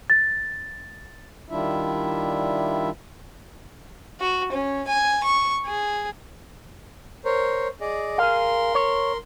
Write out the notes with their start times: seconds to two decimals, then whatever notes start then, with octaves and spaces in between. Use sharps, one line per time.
0.10 A6
1.50 D#3 G3 D4 E4 F4 E5
4.20 F#4
4.52 C#4
4.88 G#5
5.23 C#6
5.66 G#4
7.25 A#4 C5 C#5
7.81 G#4 D5 D#5
8.18 G#4 A#4 F5 C6
8.75 C#5